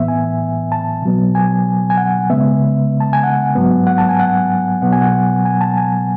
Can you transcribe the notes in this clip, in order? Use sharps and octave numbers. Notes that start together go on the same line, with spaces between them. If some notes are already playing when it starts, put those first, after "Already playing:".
Already playing: A2 E3 B3 E5
G#5
A5
B2 F#3 B3
G#5
G#5
F#5
C#3 G#3 B3 E5
A5
G#5
F#5
G#2 F#3 B3
F#5
A5
G#5
F#5
B2 F#3 B3 F#5
G#5
F#5
G#5
A5
G#5